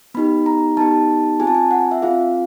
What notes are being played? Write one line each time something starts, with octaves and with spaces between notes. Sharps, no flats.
B3 D#4 G4 B5
A#5
B3 D#4 G4 A5
C4 F4 G#4 G#5
A5
G#5
F#5
E5
C4 F4 G#4 F5